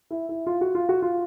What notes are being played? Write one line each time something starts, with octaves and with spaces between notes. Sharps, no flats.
E4
E4
F4
F#4
F4
F#4
F4